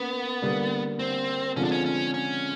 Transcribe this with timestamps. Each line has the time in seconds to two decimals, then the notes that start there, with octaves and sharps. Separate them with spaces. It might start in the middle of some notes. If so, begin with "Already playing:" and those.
Already playing: A#3 B3 C#4
0.42 D3 G3 A#3
0.99 C4
1.56 D3 F3 G#3 C4 C#4 F4
1.64 D4
1.72 C#4
1.85 C#4
2.14 C#4